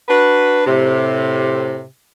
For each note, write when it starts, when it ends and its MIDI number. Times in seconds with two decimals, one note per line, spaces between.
0.08 0.62 62
0.08 0.62 66
0.08 0.62 71
0.66 1.83 45
0.66 1.83 48